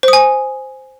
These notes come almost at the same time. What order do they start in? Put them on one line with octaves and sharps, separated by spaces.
C5 D#6 G#5